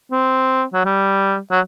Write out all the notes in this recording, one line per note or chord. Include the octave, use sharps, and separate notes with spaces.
C4
F#3
G3
F#3